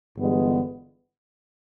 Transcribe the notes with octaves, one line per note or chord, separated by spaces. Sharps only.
G1 G2 E3 G#3 B3